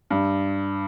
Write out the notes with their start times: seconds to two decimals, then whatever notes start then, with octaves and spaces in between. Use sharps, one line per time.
0.10 G2